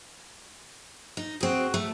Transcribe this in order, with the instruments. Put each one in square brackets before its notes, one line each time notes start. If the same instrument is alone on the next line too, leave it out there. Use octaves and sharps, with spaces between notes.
[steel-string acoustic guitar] D#4
[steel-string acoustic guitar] C4 G#4 [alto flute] F#4
[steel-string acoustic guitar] A3